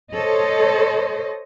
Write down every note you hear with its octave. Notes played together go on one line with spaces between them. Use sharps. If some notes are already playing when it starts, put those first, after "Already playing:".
A4 C5 C#5 D#5